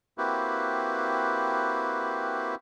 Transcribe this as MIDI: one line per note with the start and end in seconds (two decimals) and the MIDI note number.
0.18 2.55 58
0.18 2.55 60
0.18 2.55 64
0.18 2.55 66
0.18 2.55 67
0.18 2.55 71